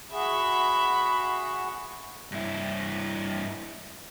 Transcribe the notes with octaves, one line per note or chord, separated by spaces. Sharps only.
F#4 G#4 E5 B5
G2 E4